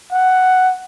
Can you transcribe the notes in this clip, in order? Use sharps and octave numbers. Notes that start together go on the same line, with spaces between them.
F#5